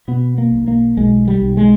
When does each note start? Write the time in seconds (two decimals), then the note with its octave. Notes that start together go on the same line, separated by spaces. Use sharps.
0.08 B2 B3
0.38 A#3
0.52 B1
0.68 A#3
0.97 B1 G#3
1.28 G3
1.42 B1
1.57 G#3